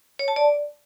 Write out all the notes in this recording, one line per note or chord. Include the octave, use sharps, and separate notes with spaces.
C#5
A5
D5